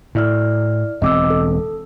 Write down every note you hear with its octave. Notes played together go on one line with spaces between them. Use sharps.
A2 E4 D5 F6
E1 C4 D#5 D6 E6
A4